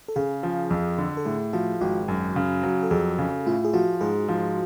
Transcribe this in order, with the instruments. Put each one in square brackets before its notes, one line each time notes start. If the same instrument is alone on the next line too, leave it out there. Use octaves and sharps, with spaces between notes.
[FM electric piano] A4
[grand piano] C#3 [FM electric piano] G#4
[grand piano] F3
F2
D3
[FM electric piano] A4
[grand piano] A2 [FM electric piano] G#4
[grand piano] F3 [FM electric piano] F#4
[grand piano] G#1 [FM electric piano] F#4
[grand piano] F#2
C#3
F#3
[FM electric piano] A4
[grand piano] F2 [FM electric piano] G#4
[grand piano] C#3
[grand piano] A2 [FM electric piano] F4
[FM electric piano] G#4
[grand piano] F3 [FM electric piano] F#4
[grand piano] G#2 [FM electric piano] G#4
[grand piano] F3